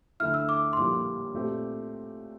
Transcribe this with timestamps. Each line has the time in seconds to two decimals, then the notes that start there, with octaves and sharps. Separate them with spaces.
0.20 D2 D3 A3 E4 F6
0.34 E6
0.49 D6
0.73 C6
0.77 A#1 A2 G3 A#3 D6
1.34 A#2 A3 C4 G4